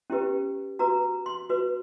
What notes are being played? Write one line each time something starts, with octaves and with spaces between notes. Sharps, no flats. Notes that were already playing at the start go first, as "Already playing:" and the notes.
C#4 E4 G4 B4
F#4 B4 A#5
C6
F#4 B4